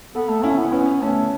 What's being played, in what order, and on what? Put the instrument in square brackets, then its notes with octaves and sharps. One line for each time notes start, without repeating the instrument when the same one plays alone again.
[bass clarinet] B3 [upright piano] A4
[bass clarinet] A3
[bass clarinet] C#4 [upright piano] E4
[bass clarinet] B3
[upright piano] B3 [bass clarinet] C#4
[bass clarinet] A3 [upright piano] C#4